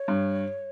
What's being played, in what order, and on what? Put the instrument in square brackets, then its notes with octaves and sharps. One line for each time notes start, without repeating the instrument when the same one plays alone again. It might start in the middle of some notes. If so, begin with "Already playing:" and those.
Already playing: [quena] C#5
[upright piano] G2